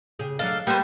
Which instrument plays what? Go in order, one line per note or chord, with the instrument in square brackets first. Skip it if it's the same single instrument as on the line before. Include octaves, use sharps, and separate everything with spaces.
[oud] C#3 G4 G#4
[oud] F#3 D4 D#5 [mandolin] A4 F5
[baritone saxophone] G3 [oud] A#3 [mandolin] B3 C5